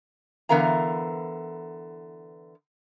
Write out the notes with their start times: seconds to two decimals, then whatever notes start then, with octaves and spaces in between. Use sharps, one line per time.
0.49 D3 E3 B3 A#4 F5 A#5